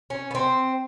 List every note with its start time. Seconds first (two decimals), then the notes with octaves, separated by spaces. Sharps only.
0.10 C#4
0.31 B3 C4